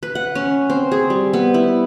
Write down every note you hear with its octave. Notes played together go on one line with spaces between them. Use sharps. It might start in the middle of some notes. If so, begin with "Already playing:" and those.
B4
F#5
C#4
C4
G#4
G3
B3
E4